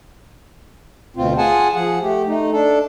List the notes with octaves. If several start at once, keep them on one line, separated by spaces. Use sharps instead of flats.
D2 B2 C4 F4
F4 G#4 F#5 G#5 A5
F3 G#4 F#5
A3 G4
A3 D#4
D4 A4